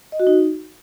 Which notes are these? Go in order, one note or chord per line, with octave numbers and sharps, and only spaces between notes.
D#5
F#4
D#4